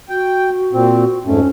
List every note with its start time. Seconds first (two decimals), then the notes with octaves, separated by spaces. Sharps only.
0.09 F#4 G5
0.73 A#2 C4
1.26 F2 G#2 A3 C#4